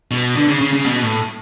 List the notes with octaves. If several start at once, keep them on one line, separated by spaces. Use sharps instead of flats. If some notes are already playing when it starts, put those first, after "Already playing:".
B2
D3
C#3
C#3
C#3
B2
A2